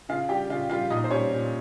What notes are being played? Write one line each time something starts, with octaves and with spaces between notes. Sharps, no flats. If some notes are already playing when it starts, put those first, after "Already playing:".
C#3 F4 F5
G3 G4 G5
C#3 F4 F5
G3 F4 F5
A#2 D#4 D#5
C5
G3 C#4 C#5
A#2